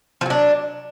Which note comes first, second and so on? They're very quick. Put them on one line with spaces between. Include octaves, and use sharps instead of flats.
F3 F#3 D4